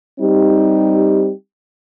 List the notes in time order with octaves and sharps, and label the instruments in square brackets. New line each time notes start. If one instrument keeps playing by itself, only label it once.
[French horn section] G3 C4 D#4 G4